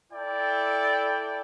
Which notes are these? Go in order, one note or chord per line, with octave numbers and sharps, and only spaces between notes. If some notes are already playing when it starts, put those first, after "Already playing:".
E4 A4 D5 G5